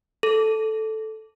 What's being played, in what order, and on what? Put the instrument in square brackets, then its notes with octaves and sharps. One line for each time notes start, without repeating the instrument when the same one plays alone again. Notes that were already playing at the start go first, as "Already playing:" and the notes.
[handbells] A4